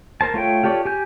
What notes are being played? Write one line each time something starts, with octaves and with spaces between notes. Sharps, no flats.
A#4 C5 A5
A3 F4 C#5 G5
F4 G4 A4 C#5 D5
G4 G#5 G6